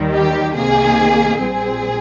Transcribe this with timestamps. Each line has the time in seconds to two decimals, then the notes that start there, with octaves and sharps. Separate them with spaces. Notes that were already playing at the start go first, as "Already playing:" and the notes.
Already playing: D#2 D#3 G3
0.12 G4
0.54 C2 C3 D#3 A#3 G#4
1.39 A#1 A#2 G3 C4 G#4